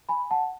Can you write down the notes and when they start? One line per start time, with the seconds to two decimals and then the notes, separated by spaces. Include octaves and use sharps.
0.09 G#5 B5
0.31 F#5 A5